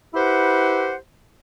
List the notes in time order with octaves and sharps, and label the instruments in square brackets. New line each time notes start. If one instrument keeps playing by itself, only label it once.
[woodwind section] E4 G4 B4 C5 F#5